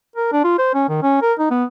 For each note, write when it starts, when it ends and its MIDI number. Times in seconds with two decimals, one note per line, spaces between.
0.16 0.29 70
0.32 0.42 62
0.44 0.58 65
0.58 0.73 72
0.74 0.84 61
0.89 0.99 51
1.03 1.22 61
1.22 1.33 70
1.39 1.49 63
1.50 1.64 59